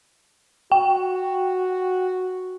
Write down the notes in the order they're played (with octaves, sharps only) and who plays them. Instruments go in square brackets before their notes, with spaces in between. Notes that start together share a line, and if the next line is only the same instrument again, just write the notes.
[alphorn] F#4 [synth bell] G5